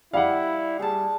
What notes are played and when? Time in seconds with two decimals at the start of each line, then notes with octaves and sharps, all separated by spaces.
0.13 G3 E4 F5 F#5
0.79 G3 G#4 A5